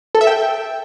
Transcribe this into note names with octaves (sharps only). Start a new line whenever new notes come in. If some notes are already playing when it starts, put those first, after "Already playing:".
A4
E5
G5